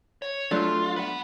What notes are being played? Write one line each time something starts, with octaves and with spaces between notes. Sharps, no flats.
C#5
F#3 A3 D4 F4
B4 F#5